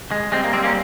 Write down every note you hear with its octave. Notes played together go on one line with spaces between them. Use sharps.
G#3
G3 G#3 C4
A#3
G3 G#3 C4
A#3 C#4